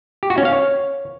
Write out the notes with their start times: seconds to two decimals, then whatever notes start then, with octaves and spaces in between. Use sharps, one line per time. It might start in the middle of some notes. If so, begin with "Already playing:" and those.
0.23 G4
0.30 F#4
0.38 C#4
0.45 F5
0.53 C#5